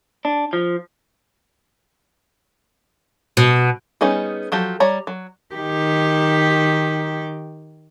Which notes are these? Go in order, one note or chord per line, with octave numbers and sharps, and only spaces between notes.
D4
F3
B2
G3 B3 C#4 D#4 G#4
F3 F#3 G4 A4
G3 C#5 A#5
F#3
D#3 G4